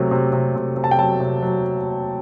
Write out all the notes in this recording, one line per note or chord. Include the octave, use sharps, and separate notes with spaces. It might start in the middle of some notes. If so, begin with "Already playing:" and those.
Already playing: C3 F#3 A3
C3
C3
C3
C3
A5
G5
F#3 A5
C3
F#3